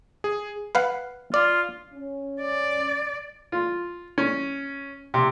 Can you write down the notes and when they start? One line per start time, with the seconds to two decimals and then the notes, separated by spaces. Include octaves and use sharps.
0.24 G#4
0.75 B4 F5 F#5
1.34 F4 D5
1.94 C#4
2.42 D5
3.52 F4
4.18 C#4
5.14 C3